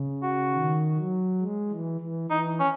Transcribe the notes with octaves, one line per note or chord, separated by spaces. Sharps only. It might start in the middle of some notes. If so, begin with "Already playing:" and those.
Already playing: C#3
F#4
D#3
F#3
G#3
E3
E3
E3 D#4
C#4